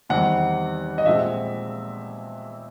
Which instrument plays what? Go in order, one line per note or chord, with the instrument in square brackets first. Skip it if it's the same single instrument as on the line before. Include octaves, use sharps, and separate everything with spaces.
[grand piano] E2 C3 D#3 G3 C4 F#5
D#5
A#2 F3 G#3 C4 E5